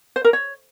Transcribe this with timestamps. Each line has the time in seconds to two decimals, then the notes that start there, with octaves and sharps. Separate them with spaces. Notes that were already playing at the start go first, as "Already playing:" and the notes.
0.16 C5
0.25 A#4
0.33 C#5